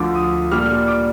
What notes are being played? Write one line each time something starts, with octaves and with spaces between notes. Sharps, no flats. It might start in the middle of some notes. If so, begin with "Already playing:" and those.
Already playing: D2 D3 F3 D6
D#6
A#2 G3 D4 F6
D6